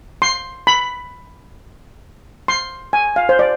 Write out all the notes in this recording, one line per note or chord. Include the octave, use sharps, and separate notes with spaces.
C6
B5
C6
G#5
F5
C5
D5